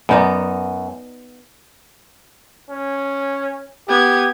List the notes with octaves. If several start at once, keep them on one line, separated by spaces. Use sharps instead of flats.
F#2 B3 D#4 D5
C#4
B3 G4 G#6